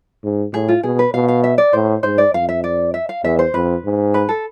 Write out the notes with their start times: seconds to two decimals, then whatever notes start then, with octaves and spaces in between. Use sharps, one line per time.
0.24 G#2
0.53 A2 G#4
0.68 F4
0.83 B2 G#4
0.99 B4
1.14 B2 F5
1.28 F5
1.44 E5
1.58 D5
1.73 A2 C5
2.03 G#2 C5
2.18 D5
2.34 F2 F5
2.49 E5
2.64 D5
2.94 E5
3.09 F5
3.24 E2 E5
3.39 C5
3.54 F2 B4
3.84 G#2
4.14 B4
4.29 A4